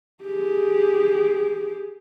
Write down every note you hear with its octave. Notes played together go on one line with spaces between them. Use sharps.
G4 G#4